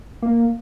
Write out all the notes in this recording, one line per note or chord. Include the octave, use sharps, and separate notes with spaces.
A#3